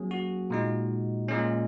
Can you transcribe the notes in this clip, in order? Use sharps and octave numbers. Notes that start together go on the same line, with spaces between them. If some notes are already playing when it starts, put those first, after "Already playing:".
Already playing: F#3 A#3 C#4 G#4
F#4
A#2 G#3 D#4
A#2 G#3 C#4